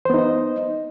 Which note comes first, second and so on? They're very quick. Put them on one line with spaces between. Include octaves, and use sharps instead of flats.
C5 B3 D#4 D#5